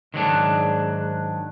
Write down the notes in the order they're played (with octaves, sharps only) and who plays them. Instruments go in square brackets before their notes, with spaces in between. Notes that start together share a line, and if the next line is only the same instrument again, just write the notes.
[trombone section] G#2 [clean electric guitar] D#3 F#3 D4